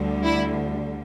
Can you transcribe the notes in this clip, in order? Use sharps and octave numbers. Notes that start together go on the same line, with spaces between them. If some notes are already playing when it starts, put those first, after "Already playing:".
Already playing: D2 D3 G3
E4